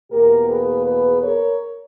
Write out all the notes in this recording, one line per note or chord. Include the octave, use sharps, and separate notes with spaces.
E2 B2 A#3 G4 A#4
G#4 B4
G#4 B4
A#4 C#5